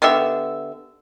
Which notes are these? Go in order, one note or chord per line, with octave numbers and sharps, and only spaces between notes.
D3 B3 G4 E5